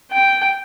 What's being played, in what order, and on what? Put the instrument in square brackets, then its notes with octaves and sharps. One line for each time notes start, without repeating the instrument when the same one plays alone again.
[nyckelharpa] G5